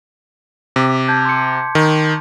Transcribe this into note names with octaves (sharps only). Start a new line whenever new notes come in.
C3 D6 B6
A5 G6 G#6
C6 C#7
D#3